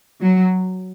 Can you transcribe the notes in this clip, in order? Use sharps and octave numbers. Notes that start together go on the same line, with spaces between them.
F#3